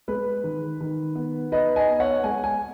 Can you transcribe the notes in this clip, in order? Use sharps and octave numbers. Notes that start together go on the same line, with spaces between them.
G#3 B4
D#3
D#3
B3
D#4 B4 D#5
D#5 G#5
B3
C#5 F#5
G#3 G#5
G#5